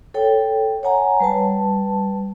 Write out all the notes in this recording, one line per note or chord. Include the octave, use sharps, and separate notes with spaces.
A4 C#5 G5
C#5 F#5 G#5 A#5
G3 B4 A5